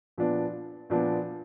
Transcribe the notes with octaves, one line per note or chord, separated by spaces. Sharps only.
A#2 F3 B3 D4
A#2 F3 B3 D4